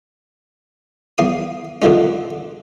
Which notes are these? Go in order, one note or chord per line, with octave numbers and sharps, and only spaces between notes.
E2 F5 D#6
F2 D3 E3 F3 G#3 C#4